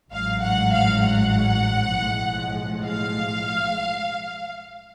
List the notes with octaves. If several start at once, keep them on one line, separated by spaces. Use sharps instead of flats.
A1 G#2 F#3 F5
F#5
F5
F#5
B1 A2 F3 G#3
F5